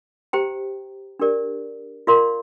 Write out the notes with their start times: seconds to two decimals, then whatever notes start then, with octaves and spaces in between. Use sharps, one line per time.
0.33 G4 C5 G5 A#5
1.19 D4 G4 A#4 D5
2.07 F4 A#4 D5 F5 C6